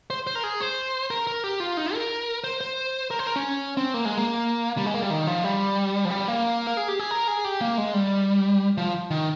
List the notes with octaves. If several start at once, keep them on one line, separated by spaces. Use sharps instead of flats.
C5
C5
A#4
G#4
C5
A#4
A#4
G4
F4
D#4
A#4
C5
C5
A#4
C5
A#4
C#4
C4
A#3
G#3
A#3
G3
G#3
A#3
G3
D#3
F3
G3
F3
G3
A#3
A#4
G#4
G4
G#4
A#4
G#4
G4
A#3
G#3
G3
F3
D#3